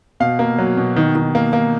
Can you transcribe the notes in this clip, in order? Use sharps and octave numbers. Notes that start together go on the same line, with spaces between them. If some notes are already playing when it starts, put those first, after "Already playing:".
B2 F5
A#3
F#3
B2
D#3
D#3
A#3
A#3